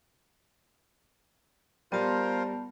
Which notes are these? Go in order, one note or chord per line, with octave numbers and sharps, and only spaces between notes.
G3 B3 F4 A#4 C5 A5